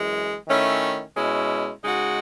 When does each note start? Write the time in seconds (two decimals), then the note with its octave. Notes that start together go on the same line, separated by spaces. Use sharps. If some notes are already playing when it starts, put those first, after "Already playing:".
Already playing: F#2 E3 G#3
0.47 D#3 A3 C#4 E4
1.15 B2 G#3 C#4 E4
1.82 C#3 G#3 D#4 F#4